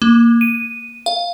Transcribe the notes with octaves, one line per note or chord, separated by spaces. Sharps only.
A#3
D#7
F5